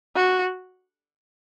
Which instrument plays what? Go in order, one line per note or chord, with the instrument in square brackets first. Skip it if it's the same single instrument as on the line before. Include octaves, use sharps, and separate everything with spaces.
[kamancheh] F#4